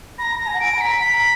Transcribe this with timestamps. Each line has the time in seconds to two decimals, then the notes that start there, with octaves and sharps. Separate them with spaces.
0.18 A#5 B5 A#6
0.40 A#6
0.47 G#5
0.54 F#5
0.60 G#5 D7
0.74 B5
0.78 A#5 B6
1.01 A#5 B6